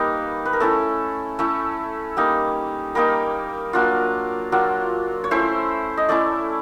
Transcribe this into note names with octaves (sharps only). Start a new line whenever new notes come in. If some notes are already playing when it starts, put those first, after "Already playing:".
Already playing: G3 A#3 D#4 B4
B4
A#4
A3 C#4 E4 A4
A3 C#4 E4
G3 A#3 D#4
G3 A#3 D#4 A#4
F#3 A#3 D4 F4
F#3 A#3 D4 F4
C#5
A3 C#4 E4 C5
D#5
A3 C#4 E4 D5